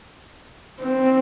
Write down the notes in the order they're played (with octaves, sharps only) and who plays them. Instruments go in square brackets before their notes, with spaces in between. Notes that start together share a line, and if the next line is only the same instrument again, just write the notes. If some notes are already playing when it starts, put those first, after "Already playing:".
[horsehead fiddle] C4